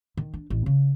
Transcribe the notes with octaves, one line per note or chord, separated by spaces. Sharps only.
D#3
D4
A1
C#3